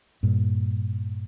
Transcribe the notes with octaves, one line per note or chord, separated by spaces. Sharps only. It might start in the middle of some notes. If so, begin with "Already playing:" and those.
G2 A#2